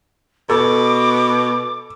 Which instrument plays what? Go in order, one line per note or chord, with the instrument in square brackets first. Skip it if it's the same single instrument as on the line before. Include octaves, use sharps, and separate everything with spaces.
[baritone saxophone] B2 [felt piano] A4 [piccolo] D6